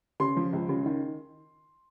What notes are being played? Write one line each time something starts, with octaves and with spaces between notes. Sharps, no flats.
C#3 C6
F3
C#2
C#3
D#3